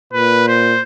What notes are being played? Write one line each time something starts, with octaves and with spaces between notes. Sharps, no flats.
A#2 B4
C5